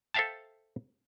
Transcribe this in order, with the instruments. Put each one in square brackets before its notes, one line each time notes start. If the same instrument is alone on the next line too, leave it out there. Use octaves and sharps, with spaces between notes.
[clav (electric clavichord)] A4 C5 E5 F5 G5 A5